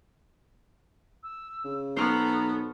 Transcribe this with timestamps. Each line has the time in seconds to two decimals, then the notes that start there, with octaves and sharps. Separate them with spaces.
1.23 E6
1.64 C#3
1.97 B1 B3 A4 C5 A#5 C#6 F6